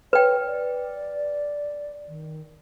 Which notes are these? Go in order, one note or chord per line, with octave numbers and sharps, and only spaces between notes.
B4 C#5 G5
D5
D#3